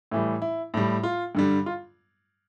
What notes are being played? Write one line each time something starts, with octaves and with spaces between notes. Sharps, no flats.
A2 E3 G3
E4
A2 G3
F4
G2 D3 G3
F4